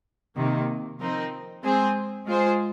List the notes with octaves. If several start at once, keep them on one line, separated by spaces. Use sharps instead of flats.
C3 D#3 A#3
F3 C4 D#4 A#4
G#3 C4 G#4 C5
G#3 F4 G#4 C5